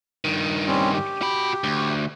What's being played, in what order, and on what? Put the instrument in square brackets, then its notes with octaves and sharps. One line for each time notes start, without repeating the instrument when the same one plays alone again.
[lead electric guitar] G2 D#3
[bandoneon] G3 C4 C#4
G4
[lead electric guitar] F#4 B5
D2